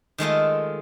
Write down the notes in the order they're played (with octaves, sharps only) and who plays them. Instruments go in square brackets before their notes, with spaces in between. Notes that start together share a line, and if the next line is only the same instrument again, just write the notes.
[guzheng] D#3 G#3 A3 F4